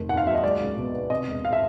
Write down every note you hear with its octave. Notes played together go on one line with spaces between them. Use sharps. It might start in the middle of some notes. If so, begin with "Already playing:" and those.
Already playing: F1 D#3
D#2 F#5
F5
F#3 E5
D#5
G#3 D5
C#2
B2
B3
C3 D#5
E1
F5
E5